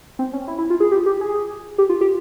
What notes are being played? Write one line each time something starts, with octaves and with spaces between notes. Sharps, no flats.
C4
C#4
E4
E4
F4
G#4
G4
G4
G#4
G4
F4
G4